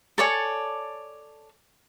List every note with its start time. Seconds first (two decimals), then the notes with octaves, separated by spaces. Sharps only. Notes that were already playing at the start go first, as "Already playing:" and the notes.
0.18 A4 C#5 D5 G#5